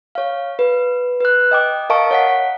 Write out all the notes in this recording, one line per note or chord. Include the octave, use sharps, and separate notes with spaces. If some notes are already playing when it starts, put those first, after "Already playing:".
C#5 F5
B4
B4 F#6
D#5 G5 D6
A#4 D#5 F5 A5 C#6 D7
C#5 F#5 B6